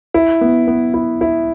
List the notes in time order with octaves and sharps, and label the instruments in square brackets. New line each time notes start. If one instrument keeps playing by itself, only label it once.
[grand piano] E4
B3
B3
E4
E4